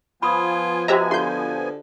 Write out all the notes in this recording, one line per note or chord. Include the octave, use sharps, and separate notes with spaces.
F3 B3 F4 G#5 B5 D#6
F#4 G4 C5 D#5 E5 A#5
D3 F4 G4 C6 G6